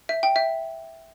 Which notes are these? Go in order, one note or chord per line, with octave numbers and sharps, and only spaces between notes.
E5
G5
E5